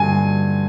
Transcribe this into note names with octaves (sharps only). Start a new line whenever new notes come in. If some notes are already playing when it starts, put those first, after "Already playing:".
Already playing: G2 D3 G#5